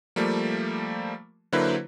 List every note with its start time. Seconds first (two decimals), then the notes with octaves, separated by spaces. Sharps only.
0.16 F3 G3 A3 A#3
1.52 D3 F#3 A#3 E4 B4 C5